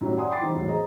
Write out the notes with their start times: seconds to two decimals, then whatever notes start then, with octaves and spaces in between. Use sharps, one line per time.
0.01 F#2 A2 D#3 F#3 G3
0.17 D5 F#5 G#5 C6 D#6
0.30 G5 B5 C6 D6 A6 C7
0.41 D#3 E3 G3 C4 D#4
0.54 G#1 E2 A2 F#3
0.68 G#4 C5 D#5 A#5